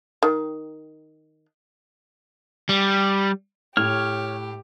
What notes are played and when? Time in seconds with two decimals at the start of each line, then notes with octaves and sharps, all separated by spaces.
0.23 D#3
2.69 G3
3.77 A2 G4 C#5 F6